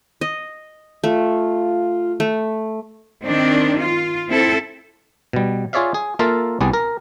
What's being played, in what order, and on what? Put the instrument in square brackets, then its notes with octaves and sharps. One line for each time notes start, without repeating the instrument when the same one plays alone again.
[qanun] D#5
[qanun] A3 [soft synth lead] F4
[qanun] A3
[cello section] D#3 C4 D4
F4
C4 E4 A4
[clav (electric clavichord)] B2 G3
F4 G#4 C#5 D5 E5 F5
G#4
A#3 F4 A4 A#4 E5 F5
C2 G3 B3 G#4 D5
A#4